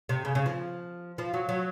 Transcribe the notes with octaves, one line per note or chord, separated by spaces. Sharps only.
C3
C#3
C#3
F3
F3
F#3
F#3